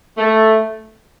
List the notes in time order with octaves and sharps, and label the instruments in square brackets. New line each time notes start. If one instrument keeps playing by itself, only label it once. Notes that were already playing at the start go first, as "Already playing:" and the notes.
[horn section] A3